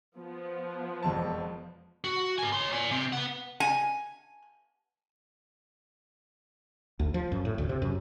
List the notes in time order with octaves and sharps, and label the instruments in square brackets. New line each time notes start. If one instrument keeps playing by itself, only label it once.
[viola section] F3 B3
[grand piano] E1 F2 A5
[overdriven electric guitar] F#4
A#4 G#5
C#5 C6
D5 G#5
C3 C4
B3 F#5
[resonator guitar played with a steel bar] G#5
[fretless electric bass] D2
F3
F#2
A2
D2
C3
F#2